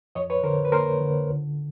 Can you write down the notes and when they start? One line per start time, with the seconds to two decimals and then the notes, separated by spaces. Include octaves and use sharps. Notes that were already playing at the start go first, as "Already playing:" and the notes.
0.15 F2 C#5 D#5
0.30 B4 C#5
0.43 D3 A#4 C5
0.65 B4
0.72 A#3 A#4 C5
1.00 D3
1.30 C#2